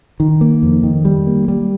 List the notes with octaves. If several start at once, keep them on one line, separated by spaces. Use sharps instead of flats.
D#3
A#3
F2
D#3
G3
A#3
G3